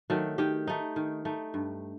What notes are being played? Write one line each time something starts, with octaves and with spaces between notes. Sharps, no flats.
D#3 F#3 A3
D#3 G4
A3 D#4
D#3
A3 D#4
G2